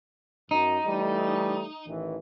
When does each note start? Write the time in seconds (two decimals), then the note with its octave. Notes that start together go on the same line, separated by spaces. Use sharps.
0.51 F#2 D#4
0.85 E3 G3 A3
1.87 A1 D#3 E3